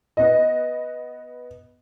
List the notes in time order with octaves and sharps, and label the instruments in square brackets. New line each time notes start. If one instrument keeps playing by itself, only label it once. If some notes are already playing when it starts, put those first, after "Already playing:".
[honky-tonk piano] B3 D#5